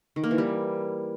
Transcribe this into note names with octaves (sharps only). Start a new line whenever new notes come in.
D#3
A#3
E3
G3